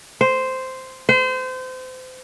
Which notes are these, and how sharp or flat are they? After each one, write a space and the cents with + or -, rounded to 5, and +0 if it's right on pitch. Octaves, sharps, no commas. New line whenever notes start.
C5 -5
C5 -30